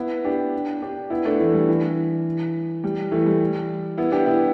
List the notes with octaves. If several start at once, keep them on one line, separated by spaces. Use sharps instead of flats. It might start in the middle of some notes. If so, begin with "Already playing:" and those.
Already playing: B3 E4
D4 G4
D4 G4
B3 E4
A3 D4
E3 A3
G3
E3
G3
E3 A3
G3
B3 E4
D4 G4
B3 E4